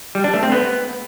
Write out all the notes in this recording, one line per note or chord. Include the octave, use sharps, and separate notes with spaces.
G3
D4
A3
C4
B3